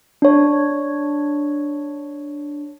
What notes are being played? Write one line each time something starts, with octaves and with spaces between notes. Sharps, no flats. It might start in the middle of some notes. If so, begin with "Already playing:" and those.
D4 C#5